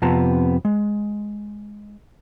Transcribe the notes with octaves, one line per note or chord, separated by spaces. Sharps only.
F2 C3 B3 F4 A5 A#5
G#3